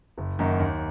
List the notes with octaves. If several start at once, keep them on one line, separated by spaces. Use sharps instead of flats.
F#1
F#2 D#3 A#3
D#2